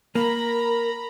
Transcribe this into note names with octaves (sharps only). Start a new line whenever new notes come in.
A#3 A#4 A#5 B5